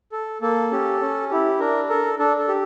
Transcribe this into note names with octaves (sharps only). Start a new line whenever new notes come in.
A4
A#3 A4
C#4 G4
C#4
E4 G4
D4 A#4
A4 A#4
D4 A4
A4
G4